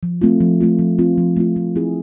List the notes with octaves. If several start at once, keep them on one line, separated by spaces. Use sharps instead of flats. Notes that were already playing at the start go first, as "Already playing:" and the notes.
F3
A3 C4 F4
F3
A3 C4 F4
F3
A3 C4 F4
F3
A3 C4 F4
A3
C4 E4 G#4